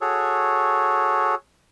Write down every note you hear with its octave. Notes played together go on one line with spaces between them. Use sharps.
F#4 G#4 A4 C#5